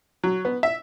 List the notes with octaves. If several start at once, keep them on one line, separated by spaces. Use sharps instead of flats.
F#3
B3
E5